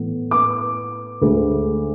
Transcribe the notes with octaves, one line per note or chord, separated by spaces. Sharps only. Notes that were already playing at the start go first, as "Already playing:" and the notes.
Already playing: A2 E3 B3
D6
D2 D3 G#3